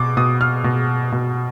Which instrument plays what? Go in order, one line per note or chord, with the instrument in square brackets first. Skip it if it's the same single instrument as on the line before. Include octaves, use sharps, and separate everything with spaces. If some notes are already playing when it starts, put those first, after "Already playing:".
Already playing: [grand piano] B2 D6
B2 D#6
F6
B2
B2